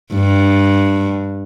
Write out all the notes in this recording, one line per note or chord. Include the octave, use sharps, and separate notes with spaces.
G2